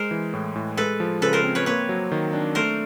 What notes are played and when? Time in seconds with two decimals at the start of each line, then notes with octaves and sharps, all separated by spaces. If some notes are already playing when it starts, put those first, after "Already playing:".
Already playing: G#3 A#4 C5
0.11 E3
0.34 A2
0.56 A2
0.77 G#3 A4 B4
1.00 F3
1.22 C#3 A4 B4
1.33 A#4 C5
1.44 C4
1.55 B4 C#5
1.66 A#3 B4 C#5
1.89 F#3
2.12 D#3
2.33 D4
2.55 A3 A#4 C5